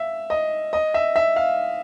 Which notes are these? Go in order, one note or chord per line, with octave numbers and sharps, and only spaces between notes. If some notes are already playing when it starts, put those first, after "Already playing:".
Already playing: E5 F5
D#5
D#5
E5
E5
F5